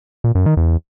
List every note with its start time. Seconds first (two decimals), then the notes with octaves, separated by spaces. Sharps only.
0.24 A#2
0.35 F#2
0.46 D#3
0.57 E2